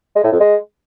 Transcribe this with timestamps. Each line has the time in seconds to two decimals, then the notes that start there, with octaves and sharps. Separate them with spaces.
0.16 G#3
0.24 A2
0.32 F2
0.40 G#3